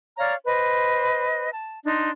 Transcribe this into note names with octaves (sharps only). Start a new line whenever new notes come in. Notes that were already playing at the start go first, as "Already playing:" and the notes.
C#5 D5 F5 A#5
B4 C5 D#5
A5
D4 D#4 C6